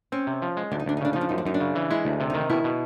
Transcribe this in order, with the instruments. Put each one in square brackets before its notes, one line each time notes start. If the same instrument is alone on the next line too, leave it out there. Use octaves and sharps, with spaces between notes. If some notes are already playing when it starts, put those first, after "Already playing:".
[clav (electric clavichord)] C4 [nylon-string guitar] C#4
[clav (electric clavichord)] C3
F3
G#3
[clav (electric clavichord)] D2 [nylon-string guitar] D4
[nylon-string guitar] D#4
[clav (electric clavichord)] D2 [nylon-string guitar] D4
[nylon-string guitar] D#4
[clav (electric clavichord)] C#3 [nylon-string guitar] D4
[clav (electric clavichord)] F3 [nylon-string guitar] D#4
[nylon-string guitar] D4
[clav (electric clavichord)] F#2 [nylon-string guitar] D#4
[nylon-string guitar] D4
[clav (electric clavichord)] F#2 [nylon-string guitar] D#4
[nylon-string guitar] D4
[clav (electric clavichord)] C#3
E3
[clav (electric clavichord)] G#3 [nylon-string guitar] E4
[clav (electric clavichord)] D2
C3
[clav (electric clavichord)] D#3 [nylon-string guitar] D#4
[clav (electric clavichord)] B2 [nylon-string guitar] E4
[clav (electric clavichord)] B2